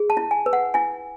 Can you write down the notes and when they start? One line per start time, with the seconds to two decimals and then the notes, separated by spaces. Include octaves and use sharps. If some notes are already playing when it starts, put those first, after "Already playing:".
Already playing: G#4
0.10 A5
0.17 E4
0.31 G#5
0.46 B4
0.53 F#5
0.74 E4 G#5